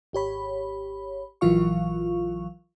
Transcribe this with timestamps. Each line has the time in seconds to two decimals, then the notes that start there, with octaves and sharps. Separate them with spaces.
0.13 G#1 G4 C#5 B5
1.41 A#1 E3 F#3 F4 F5 C#6